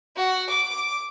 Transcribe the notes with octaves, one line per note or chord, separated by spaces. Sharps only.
F#4
D6